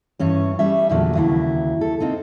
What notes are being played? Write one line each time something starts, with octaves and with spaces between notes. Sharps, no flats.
G2 E3 C#4 C#5
G3 A3 C#4 E5
E2 A#2 D3 F3 F#3
D#2 C#3 F#3 E4
A4
A#3 C4 D#4